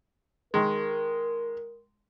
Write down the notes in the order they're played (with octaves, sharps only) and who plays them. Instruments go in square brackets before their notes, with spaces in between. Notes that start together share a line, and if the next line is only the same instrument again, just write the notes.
[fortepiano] D#3 G#3 [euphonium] A#4